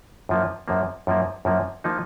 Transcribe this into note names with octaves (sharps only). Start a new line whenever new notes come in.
F#2 F3 A#3
F#2 F3 A#3
F#2 F3 A#3
F#2 F3 A#3
F3 A#3 D#4